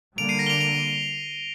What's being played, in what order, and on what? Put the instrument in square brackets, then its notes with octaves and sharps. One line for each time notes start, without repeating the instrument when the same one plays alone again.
[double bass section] D3 G3 A#3 [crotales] D7 F7
[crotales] C7 D#7
A#6 D7
G7
D7 F7
D7 F7